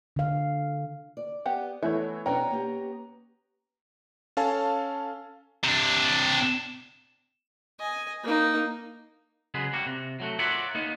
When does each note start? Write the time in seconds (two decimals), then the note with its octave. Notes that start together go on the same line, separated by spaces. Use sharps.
0.16 D3 F5
1.17 D5
1.46 B3 G4 F#5
1.83 E3 A3 B3 E4 C#5 E5
2.26 B2 B3 C#4 D4 F#4 G5 A#5
2.51 A#3 G4
4.37 C#4 A4 F5 G#5 A5
5.64 C3 D4
7.79 D#5 G#5
8.24 A#3 D#4
9.54 C#3 F#3 G#3 G#4 B4
9.73 G3 A#3 F#4
9.86 C3
10.20 F#3 A3 F#4
10.39 F4 A#4 C#5 D5 E5 F#5
10.75 A#3 B3 D#4